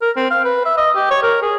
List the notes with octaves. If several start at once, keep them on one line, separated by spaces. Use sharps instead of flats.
A#4
C4
F5
B4
E5
D#5
G4
C#5
A#4
G#4